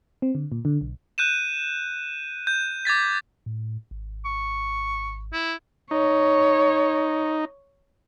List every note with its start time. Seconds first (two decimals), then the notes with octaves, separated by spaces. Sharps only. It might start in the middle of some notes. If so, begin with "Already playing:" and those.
0.22 C4
0.35 D3
0.52 A#2
0.65 D3
0.81 B1
1.18 F#6 G6 D#7 E7
2.47 G6
2.85 D6 G#6 A6 B6
3.46 A2
3.91 G#1
4.25 C#6
5.33 E4
5.91 D#4 C#5